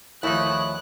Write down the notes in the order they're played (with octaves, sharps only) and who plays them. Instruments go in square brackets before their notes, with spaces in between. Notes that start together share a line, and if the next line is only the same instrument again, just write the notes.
[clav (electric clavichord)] D#2 A3 D#4 [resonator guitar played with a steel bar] F3 E4 [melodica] C#5 D#6 [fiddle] F#6